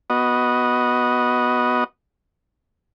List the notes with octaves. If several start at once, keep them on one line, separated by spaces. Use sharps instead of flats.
B3 F#4 D#5